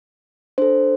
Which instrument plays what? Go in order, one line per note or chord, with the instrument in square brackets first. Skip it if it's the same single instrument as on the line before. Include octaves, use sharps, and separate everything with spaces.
[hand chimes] D4 A4 C5